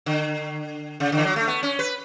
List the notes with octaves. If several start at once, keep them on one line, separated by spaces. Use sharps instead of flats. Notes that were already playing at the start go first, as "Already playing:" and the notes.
D3
C#3
D3
E3
F#3
A3
B3
C#4
B4